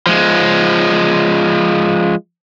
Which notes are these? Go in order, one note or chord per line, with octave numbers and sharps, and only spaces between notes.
F3 G#3